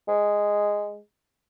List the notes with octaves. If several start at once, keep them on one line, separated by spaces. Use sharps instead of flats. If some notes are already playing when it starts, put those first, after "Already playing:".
G#3